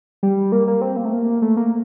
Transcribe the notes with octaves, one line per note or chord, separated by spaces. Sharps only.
G3
A#3
A#3
C4
A#3
A3
A#3
A3
A#3